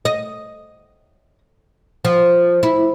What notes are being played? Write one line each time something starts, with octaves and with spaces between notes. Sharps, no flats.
D#5
F3
E4